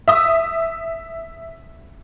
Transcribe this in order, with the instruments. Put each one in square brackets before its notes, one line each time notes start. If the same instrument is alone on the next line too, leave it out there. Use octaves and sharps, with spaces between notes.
[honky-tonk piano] E5 D#6 E6